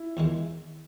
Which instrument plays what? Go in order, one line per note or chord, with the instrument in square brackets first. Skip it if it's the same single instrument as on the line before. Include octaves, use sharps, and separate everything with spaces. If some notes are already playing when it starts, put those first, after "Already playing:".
Already playing: [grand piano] E4
[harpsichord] E2 D#3 G#3